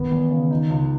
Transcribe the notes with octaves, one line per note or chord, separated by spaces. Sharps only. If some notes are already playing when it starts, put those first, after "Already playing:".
Already playing: D#3 B3
E2
C#3
D#4
C#2